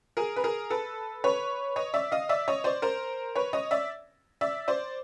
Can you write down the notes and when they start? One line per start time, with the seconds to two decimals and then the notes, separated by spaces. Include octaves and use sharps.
0.17 G#4 A#4
0.36 B4
0.44 G#4 A#4
0.70 A4 B4
1.24 B4 C#5
1.76 C#5 D#5
1.94 D5 E5
2.12 D#5 F5
2.29 D5 E5
2.48 C#5 D#5
2.64 C5 D5
2.82 A#4 C5
3.35 B4 C#5
3.53 C#5 D#5
3.71 D5 E5
4.41 D5 E5
4.68 C5 D5